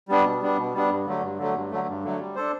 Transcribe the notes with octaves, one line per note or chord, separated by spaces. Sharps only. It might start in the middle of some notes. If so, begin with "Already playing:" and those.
G3 B3 D4
B2
G3 B3 D4
B2
G3 B3 D4
G2
D3 F#3 A3
G2
D3 F#3 A3
G2
D3 F#3 A3
G2
D3 F#3 A3
G3
D4 A4 C5